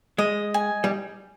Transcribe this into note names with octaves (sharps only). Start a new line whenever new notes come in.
G#3 D#5
G#5
G3